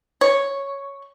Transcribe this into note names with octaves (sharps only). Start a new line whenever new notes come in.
C#5